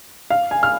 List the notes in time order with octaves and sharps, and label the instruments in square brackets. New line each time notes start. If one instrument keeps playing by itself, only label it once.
[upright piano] F5
G#5
F6